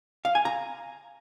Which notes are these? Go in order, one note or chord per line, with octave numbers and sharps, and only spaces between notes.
F5
G#5
A#5